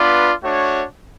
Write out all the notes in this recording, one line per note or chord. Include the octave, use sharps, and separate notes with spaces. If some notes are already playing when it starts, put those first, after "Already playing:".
Already playing: B3 D4 F4 B4 D5
A3 D4 F#4 C#5